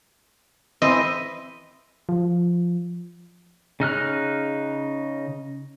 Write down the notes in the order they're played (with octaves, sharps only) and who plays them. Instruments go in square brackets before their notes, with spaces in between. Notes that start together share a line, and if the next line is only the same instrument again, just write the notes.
[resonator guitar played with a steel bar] E3 C4 B4 [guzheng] D#5
[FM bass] F3
[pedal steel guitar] C#3 D#4 F6 F#6